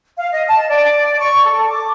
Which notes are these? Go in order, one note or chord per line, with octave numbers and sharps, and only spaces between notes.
F5
D#5
A5
D5
C#6
A4
D6